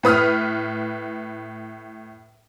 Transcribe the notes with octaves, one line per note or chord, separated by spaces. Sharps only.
A2 B4 D#6 F6